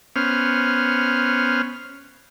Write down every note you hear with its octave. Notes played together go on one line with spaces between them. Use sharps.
B3 C#4 C5 F6